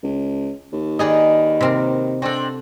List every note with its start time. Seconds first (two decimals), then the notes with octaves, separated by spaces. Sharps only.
0.03 C#2
0.72 D#2
0.99 D#3 D#4 G#4 B4 D5 D#5
1.61 C3 C4 A#4
2.22 C4 D4 F#4 A4